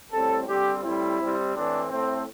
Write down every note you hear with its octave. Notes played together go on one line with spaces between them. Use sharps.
A2 G3 C4 A4
D3 G3 C4 G4
A2 G3 C4 E4
C3 G3 C4
A2 E3 C4 D4
A2 A3 C4